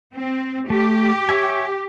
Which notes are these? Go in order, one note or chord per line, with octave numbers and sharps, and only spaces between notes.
C4
A3 G4
C#5 E5 G#5